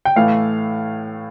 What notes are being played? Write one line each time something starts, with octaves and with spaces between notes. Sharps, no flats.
G5
A2 E3 A3 F5